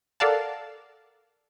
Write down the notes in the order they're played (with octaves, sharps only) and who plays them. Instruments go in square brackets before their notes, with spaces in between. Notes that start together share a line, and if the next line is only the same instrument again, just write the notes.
[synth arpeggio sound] A4 A#4 D5 F5 F#5 A5